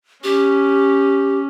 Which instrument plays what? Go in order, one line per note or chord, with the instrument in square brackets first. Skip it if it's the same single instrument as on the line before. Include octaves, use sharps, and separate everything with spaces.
[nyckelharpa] C#4 [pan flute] G4